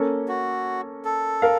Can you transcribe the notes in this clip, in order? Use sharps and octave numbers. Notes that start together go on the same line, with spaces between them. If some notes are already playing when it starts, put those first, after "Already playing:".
Already playing: A#3 C#4 A4
F#4
A4
A#4 F5